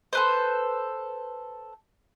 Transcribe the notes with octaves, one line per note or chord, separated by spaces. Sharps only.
A4 B4 C5